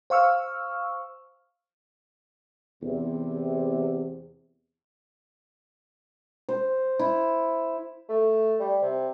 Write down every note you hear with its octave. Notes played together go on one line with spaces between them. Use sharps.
C5 F5 C#6 E6 F6
E2 C3
C5
E4
A3
G3
C3